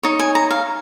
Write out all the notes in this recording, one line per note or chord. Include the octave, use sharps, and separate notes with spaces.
D#4 C#5
G#5
A#5
F5